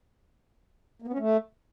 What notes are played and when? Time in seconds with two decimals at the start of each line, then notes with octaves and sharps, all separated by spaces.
1.02 A#3
1.08 B3
1.13 C#4
1.19 A3